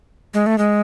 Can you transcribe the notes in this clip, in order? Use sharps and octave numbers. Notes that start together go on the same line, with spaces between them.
G#3
A3
G#3